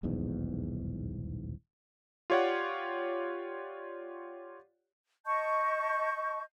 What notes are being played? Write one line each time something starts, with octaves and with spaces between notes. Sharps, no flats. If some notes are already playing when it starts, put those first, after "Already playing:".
D#1 B1 E2 G#2
F4 G4 C#5 D5 F#5
D#5 A5 C#6 G6